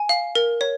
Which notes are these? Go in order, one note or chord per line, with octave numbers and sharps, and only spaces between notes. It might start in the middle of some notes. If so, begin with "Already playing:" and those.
Already playing: G#5
F5
A#4
C#5